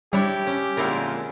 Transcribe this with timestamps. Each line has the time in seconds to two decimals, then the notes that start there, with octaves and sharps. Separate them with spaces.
0.13 G3 D4 E4 G4 C#5
0.47 C#4
0.77 F2 A#2 D3 G#3 E4 A#4